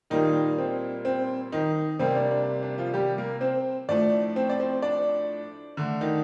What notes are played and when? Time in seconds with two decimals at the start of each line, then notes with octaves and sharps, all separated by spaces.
0.10 A#2 D#3 G3 A#3 D#4
0.58 C4
1.05 C4
1.52 D#3 D#4
1.99 C3 G3 A#3 C4
2.15 D4
2.31 D4
2.63 D4
2.78 F3 F4
2.94 G3 G4
3.18 A#3 A#4
3.41 C4 C5
3.88 A2 F3 A3 D4 D5
4.36 C4 C5
4.50 D5
4.60 C4 C5
4.82 D4 D5
5.77 D3 A3
6.01 D#3 D#4